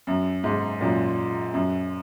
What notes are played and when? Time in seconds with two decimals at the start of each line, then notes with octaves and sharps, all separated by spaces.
0.07 F#2
0.44 G#2
0.81 F#2 A#2
1.54 F#2